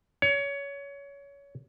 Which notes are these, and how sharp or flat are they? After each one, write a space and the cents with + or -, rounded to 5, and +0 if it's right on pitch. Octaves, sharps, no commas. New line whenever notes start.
C#5 +20